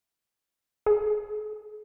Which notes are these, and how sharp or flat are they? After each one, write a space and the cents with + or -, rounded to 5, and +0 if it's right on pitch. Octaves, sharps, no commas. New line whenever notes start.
G#4 +45